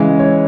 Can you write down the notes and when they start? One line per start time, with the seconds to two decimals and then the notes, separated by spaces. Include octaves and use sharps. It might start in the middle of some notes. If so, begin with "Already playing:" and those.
Already playing: C#3 E3 G#3
0.19 C#5